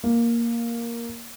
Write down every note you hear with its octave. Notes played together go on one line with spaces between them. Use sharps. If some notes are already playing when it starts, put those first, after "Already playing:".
A#3